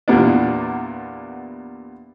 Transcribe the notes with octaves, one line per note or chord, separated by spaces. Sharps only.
E2 A#2 G3 A#3 B3 D4